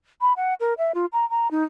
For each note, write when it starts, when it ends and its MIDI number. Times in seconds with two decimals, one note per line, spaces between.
0.21 0.33 83
0.36 0.54 78
0.60 0.74 70
0.78 0.92 76
0.95 1.06 65
1.13 1.28 82
1.30 1.50 82
1.51 1.64 63